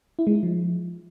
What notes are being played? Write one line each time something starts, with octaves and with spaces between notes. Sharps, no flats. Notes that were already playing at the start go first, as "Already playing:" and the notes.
E4
G#3
D#4
F3